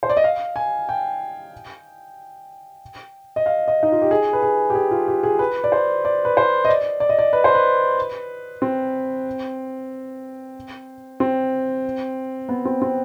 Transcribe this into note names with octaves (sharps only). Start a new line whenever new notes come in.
C5
D5
D#5
F5
G#5
G5
D#5
F5
D#5
D#4
F4
G4
G#4
B4
G#4
G4
G#4
F4
G4
G#4
B4
D5
C5
D5
B4
C5
D#5
D5
D5
D#5
D5
B4
C5
B4
C4
C4
B3
C4
C4